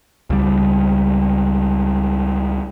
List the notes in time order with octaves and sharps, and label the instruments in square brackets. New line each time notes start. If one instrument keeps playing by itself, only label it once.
[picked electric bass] C#2 G3